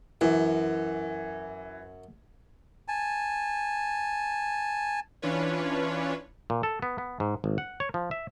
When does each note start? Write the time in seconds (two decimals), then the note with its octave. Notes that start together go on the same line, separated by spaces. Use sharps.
0.21 F#2 E3
2.88 G#5 A5
5.22 E3 C#4 D4 F4 B4 C#5
6.50 A#2
6.63 A4
6.82 B3
6.98 B3
7.20 G#2
7.44 G#1
7.58 F#5
7.80 C#5
7.94 F3
8.11 E5